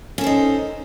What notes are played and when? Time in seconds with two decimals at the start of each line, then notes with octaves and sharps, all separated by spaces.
0.18 C#4
0.21 A4
0.24 C5
0.27 D#4